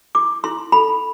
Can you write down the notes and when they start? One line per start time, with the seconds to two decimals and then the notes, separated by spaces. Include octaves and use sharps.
0.15 E4 D6
0.44 E4 C6
0.72 A4 B5